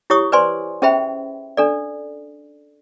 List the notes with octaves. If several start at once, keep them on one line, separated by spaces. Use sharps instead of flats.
E4 G4 C#5 C#6 D#6
B4 C5 D5 G#5 C6
C#4 G#4 C5 E5 G5 B5
D4 A4 D5